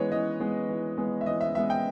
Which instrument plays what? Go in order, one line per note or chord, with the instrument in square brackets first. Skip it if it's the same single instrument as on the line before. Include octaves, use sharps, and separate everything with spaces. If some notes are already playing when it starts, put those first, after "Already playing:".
Already playing: [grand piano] E3 G#3 B3 B4 C#5
E3 D#5
G#3 B3
E3
G#3 B3
E5
E3 D#5
E5
G#3 B3 E5
G5